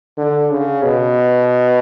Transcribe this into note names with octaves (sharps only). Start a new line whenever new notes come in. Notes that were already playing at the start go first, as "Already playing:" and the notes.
D3
C#3
B2